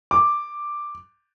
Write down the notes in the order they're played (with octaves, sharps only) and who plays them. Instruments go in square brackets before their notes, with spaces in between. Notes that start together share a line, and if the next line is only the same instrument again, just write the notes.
[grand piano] D6